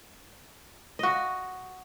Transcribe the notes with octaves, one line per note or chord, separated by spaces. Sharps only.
F#4 D#5